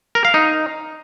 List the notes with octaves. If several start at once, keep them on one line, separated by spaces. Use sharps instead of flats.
A#4
F5
D#4